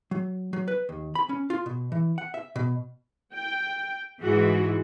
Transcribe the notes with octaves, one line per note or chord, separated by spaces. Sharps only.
F#3
F#3
B4
D#2
B5
C#4
F4
B2
E3
F#5
E5
B2
G5
G#2 E3 F#4 G#4